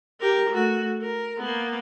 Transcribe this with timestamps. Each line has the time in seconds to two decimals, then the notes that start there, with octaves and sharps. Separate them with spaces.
0.21 G4 A#4
0.50 A3 F#4
1.01 A#4
1.39 A#3 B3